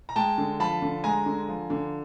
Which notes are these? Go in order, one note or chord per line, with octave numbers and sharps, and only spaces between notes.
A#5
G#3 G5 A5
D3
F3 A5 B5
D3
G#3 G#5 A#5
D3
F3
D3